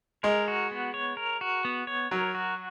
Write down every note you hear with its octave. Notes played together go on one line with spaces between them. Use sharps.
G#3 A#4
F#4
B3
C#5
A#4
F#4
B3
C#5
F#3 A#4
F#4